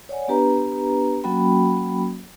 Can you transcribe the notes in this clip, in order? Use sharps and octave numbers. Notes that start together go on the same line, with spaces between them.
C#5 D5 F#5 G#5
B3 D4 G4 B4 A#5
F#3 A#3 C#4 F#4 G5 B5